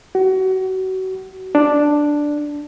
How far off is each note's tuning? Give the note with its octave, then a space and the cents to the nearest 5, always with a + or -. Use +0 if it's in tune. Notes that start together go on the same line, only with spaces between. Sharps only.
F#4 +30
D4 +5